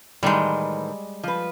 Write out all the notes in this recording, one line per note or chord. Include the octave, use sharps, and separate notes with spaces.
A2 D#3 E3 G3 G#3
F3 B4